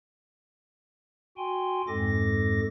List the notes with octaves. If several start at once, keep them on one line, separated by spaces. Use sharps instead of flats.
F#4 G5 G#5 C6
F2 G#2 G#3 A4 D6 A#6